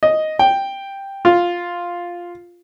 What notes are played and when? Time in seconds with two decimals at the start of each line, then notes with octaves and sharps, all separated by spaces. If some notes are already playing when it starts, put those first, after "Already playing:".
0.03 D#5
0.39 G5
1.25 F4